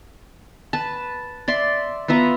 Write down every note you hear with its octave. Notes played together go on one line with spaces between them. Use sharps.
B4 A5
D5 E5 C6
B3 F4 E5 A#5